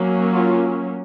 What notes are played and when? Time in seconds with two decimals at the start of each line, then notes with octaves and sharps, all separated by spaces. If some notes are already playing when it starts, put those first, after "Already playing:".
Already playing: F#3 A#3 C#4
0.32 F4